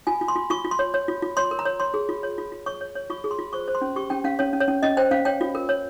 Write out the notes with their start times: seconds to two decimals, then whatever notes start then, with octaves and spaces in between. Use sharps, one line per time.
0.07 F4 G#5
0.21 F4
0.28 C6
0.36 F4
0.50 F4 C#6
0.65 F4
0.71 C6
0.79 C#5
0.94 C#5
1.08 F4
1.22 F4
1.37 C#5 C6
1.51 A#4
1.59 A#5
1.65 C#5
1.80 C#5 C6
1.94 G#4
2.09 F4
2.23 C#5
2.38 F4
2.52 F4
2.66 C#5 C#6
2.81 C#5
2.95 C#5
3.10 F4 C#6
3.24 G#4
3.31 C6
3.39 F4
3.53 C5 C#6
3.68 C5
3.75 C6
3.81 C#4
3.96 G4 C#6
4.10 C#4 G5
4.24 C#4 F5
4.39 C#4 C#5
4.53 C#4
4.60 C#5
4.68 C#4
4.83 C#4 D#5
4.97 C5 G5
5.11 C#4 F5
5.25 C#5 G5
5.41 F4
5.55 A#4
5.69 C#5